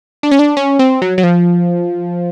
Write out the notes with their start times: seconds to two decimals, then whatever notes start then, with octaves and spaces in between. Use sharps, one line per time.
0.23 D4
0.31 C#4
0.39 D4
0.57 C#4
0.79 C4
1.02 F#3
1.18 F#3
1.23 F3